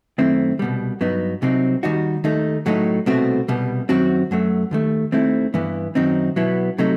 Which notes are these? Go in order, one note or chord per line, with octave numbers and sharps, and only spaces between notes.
F#2 D#3 A3 C4 E4
C2 B2 G3
G2 F#3 B3 D#4
C2 C3 F#3 C4 D#4
D#2 D#3 G3 D#4 F#4
D#2 D#3 A3 D#4
A2 F#3 A3 D#4
C2 B2 A3 C4 F#4
C2 B2 G3
F#2 D#3 F#3 C4 F#4
F#2 F#3 A3
D#2 D#3 A3
D#2 D#3 A3 C4 E4
G2 E3 B3
F#2 D#3 F#3 C4 D#4
B2 F#3 B3 E4
C3 F#3 A3 D#4